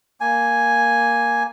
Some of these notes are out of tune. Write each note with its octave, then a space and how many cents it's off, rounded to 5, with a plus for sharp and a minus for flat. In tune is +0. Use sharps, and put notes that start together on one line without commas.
A#3 +0 G#5 +0